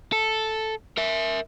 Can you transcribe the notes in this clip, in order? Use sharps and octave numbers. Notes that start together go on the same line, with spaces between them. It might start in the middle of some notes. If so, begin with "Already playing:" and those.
A4
A#4 E5